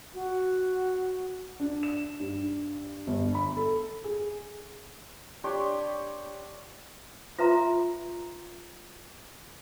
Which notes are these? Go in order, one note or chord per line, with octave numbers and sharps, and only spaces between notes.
F#4
D4
E7
G2
G1
B5
A4
G#4
D4 G4 C#5 C6
F4 B4 E5 A#5 C6